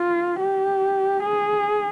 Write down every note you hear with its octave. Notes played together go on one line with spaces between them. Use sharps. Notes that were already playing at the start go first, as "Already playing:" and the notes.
Already playing: F4
G4
G#4